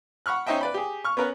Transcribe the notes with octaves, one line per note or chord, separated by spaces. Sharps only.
F#5 B5 C#6 F6 F#6
C#4 D#4 C5 D#5 E5 G5
B4 D5 B5
G4 G#4
C#6 F6
B3 C#4 A#4 B4